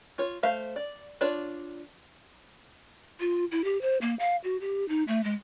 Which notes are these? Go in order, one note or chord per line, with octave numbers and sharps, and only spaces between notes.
F4 C#5
A3 C5 F5
D5
D4 F4 C#5 D5
F4
E4
G4
C5
A#3
F5
F#4
G4
D#4
A3
G#3